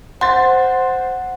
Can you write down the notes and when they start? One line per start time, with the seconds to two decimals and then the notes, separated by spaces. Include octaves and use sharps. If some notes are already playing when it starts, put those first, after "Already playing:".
0.21 C5 F#5 C6 A6